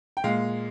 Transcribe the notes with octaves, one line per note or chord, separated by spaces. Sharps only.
G5
A#2 G#3 F5